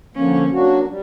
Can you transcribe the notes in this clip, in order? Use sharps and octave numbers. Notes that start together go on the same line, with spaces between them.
D3 F3 A#3 C#4
F#3 A#3 D4 F#4
G3